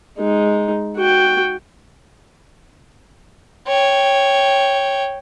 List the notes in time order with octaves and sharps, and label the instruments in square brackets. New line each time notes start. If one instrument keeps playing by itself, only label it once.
[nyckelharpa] G#3 D#4
F#4 G5
[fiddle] C#5 G5